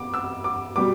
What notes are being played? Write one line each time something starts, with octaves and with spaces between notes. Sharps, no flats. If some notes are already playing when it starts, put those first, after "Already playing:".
Already playing: B2 D6
E6
D6
B2 G3 D6